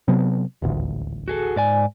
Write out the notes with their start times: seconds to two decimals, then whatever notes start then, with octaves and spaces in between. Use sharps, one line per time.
0.08 C3 F#3 B3
0.62 D#1 A1 D2
1.28 F#4 G#4 A4
1.56 G#2 D5 G#5